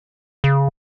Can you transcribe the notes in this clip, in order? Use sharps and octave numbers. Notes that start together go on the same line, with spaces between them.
C#3